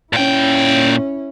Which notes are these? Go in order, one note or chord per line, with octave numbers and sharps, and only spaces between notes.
A#2 C#4 E4 G5